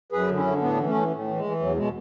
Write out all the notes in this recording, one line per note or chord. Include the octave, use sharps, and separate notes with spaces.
F#2 G#4 B4
D3
C#4 E4
D3
A2 B3 D4
E3
A3 C#4
E3
A2
E3
G#3
E3
E2 F#3
B2 G#3